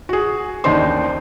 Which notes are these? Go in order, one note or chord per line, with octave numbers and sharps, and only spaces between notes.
F#4 G#4
A1 D#2 D4 D#4 C5 C6